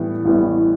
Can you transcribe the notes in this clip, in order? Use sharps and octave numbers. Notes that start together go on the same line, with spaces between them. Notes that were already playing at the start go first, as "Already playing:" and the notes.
Already playing: A2 E3 G3 B3
A1 A2 E3 G3 B3